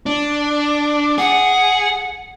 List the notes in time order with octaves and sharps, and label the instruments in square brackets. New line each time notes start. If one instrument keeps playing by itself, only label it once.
[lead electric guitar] D4
[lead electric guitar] G#4 [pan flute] F#5